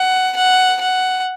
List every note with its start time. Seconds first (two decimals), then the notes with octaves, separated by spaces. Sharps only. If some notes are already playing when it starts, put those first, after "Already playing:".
Already playing: F#5
0.36 F#5
0.81 F#5